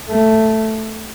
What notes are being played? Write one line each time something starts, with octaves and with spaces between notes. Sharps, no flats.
A3